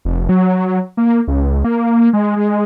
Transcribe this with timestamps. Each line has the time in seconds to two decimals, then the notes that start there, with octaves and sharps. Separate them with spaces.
0.05 F1
0.29 F#3
0.97 A#3
1.28 C#2
1.65 A#3
2.13 G#3
2.36 G#3